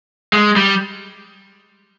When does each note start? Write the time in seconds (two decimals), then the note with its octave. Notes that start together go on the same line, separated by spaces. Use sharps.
0.33 G#3
0.56 G3